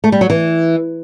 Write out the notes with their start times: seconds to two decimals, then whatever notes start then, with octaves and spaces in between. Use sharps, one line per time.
0.04 A3
0.12 G3
0.21 F#3
0.30 E3